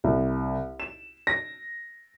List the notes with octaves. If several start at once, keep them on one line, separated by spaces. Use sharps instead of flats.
C2
E7
A#6